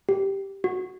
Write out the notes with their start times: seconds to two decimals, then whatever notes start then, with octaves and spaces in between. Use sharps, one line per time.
0.09 G4
0.64 F#4